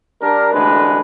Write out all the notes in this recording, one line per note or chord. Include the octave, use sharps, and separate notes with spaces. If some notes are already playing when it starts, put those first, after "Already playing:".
G3 D4 A#4
A1 D2 D3 G#3 D4 B4